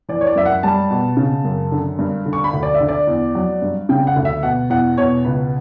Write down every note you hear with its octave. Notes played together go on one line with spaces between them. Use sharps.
E3 D5
C#5
D5
F#2 E5
F#5
G3 A5
B2
C#3
F#2
D3
G2
D3
C#6
B5
D2
D5
E5
D3
D5
E2
F#3
G2
C#3 G5
F#5
D2
E5
B2 F#5
E2 F#5
B2 C#5
C#2 B4